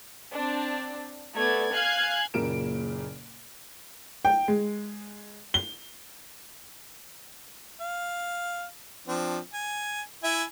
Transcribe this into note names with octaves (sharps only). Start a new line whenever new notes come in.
C4 D4
A3 B3 D5 G#6
F5 G#5 F#6 G#6 C7
F#1 A#2 C#3 A#4 D7 E7
G5
G#3
G7
F5
F3 C4 D4
G#5
E4 E5 G#5